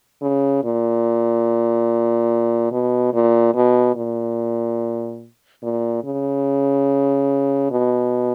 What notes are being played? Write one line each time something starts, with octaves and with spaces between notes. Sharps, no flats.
C#3
A#2
B2
A#2
B2
A#2
A#2
C#3
B2